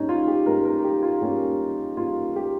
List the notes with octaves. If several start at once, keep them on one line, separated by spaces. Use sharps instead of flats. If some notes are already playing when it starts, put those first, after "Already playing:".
Already playing: G#2 G3 A#3 C#4 D#4
F4
G4
G#2 G3 A#3 C#4 A#4
A#4
G4
F4
G#2 G3 A#3 C#4 G4
G#2 G3 A#3 C#4 F4
G4